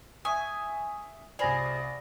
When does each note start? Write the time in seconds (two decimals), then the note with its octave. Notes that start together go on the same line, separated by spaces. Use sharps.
0.25 E5 G#5 C#6 D#6
1.39 C2 F4 G#4 C5 D5 G#5 B5 A#6